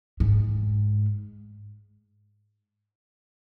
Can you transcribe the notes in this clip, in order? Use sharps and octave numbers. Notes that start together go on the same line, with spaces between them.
G#2